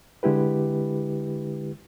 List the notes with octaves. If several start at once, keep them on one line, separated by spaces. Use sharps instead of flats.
D3 G#3 E4 G4 B4